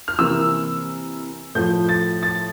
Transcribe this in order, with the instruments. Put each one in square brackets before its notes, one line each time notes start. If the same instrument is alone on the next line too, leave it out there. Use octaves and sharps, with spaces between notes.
[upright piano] F6
C3 E3 A#3 E6
A2 F3 A3 G6
A6
A6